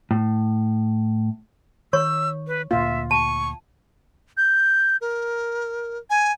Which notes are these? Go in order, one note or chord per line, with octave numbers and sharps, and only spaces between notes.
A2
D#3 C#5 C#6 E6
B4
D2 A#2 A#3 F4 E5
A5 C#6
G6
A#4
G#5